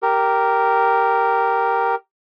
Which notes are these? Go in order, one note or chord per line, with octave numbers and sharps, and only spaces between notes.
G4 A#4